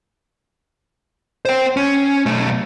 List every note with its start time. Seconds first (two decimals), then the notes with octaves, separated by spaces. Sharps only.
1.45 C5 G5
1.77 C#4
2.26 B1 A3